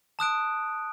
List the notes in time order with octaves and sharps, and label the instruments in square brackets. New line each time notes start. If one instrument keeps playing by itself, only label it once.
[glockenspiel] A5 D#6 F#6 D7